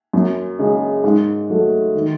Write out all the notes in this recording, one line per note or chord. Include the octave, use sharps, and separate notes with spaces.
F#2
C#3 G#3
G#2
F#3 A3
D#3